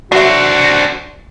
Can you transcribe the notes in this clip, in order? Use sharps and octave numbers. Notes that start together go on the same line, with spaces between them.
F#3 D4 F#4 C5 E5